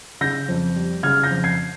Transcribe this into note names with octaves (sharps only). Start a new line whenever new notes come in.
C#3 G6 A#6
F2
G3
C#3 F6 G#6
G6 A#6
F2
G#6 C7